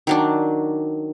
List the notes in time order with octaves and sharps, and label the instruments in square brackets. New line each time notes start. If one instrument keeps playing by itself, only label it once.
[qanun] D#3 F#3 D4